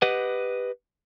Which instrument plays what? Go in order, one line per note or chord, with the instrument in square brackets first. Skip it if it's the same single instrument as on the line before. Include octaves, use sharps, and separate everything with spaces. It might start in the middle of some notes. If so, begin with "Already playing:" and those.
[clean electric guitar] G4 B4 D#5 F#5